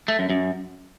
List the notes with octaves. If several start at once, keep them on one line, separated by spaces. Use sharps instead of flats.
A3
F#2
F#2